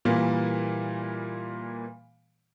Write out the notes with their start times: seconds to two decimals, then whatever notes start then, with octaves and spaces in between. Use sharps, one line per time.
0.05 A#2 E3 G3 A#3